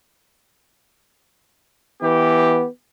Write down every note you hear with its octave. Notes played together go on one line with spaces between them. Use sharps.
E3 B3 G4